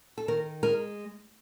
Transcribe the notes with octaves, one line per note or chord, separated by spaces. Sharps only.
A4
D#3 A#4
G#3 A#4